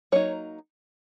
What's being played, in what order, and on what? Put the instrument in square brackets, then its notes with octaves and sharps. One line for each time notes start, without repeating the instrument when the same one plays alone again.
[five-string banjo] F#3 A#3 D#4 C#5